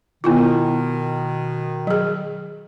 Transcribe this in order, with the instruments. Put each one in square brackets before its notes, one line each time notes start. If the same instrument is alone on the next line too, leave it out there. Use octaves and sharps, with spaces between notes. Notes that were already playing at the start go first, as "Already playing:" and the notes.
[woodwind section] B2 D#3 [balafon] B3 E4 F4
[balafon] F#3 G#4